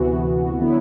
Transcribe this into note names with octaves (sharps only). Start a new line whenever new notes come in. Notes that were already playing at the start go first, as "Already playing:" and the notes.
Already playing: D2 C3 E3 B3 F#4
D3 F#3 B3 E4